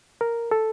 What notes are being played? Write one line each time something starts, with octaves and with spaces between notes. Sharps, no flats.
A#4
A4